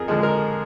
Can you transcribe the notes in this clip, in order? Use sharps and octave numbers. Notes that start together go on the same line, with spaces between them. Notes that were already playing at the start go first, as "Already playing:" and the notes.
Already playing: F2 G#4 A#4
D3 F3 G#3
A#4